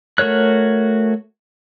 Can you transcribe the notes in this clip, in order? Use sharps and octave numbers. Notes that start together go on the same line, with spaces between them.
A3 F#4 A#4 C#5 F#6